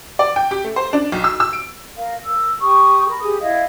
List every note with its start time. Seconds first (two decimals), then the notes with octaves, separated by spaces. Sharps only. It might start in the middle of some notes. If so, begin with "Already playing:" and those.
0.19 D5
0.36 G5
0.51 G4
0.64 A3
0.76 C5
0.93 D4
1.12 B1
1.24 E6
1.40 E6
1.53 D7
1.97 A#4 F5
2.25 A#4 E6
2.61 G4 G5 C#6 D#6
3.08 A#4 B5
3.23 G4 G#4 D#6
3.40 E4 D#5 F5